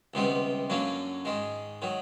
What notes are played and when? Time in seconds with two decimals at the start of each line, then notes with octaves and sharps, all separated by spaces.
0.14 C#2 C3 D#3 G3 B3
0.70 F#2 D3 F#3 A#3 C#4
1.25 G#2 D#3 G#3
1.82 D#3 F#3